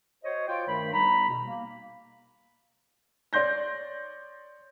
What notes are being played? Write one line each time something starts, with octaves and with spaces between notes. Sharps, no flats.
F#4 C5 C#5 D#5
F4 C#5 D5 G5
G2 D#3 A3 C5 B5
E2 G3 D#4 A#5 B5
B2
A#3
C#5 D5 C6 G6 A#6